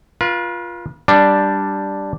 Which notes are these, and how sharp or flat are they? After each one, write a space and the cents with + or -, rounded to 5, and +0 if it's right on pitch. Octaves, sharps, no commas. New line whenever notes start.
F4 +0 B4 -40
G3 +0 D4 +0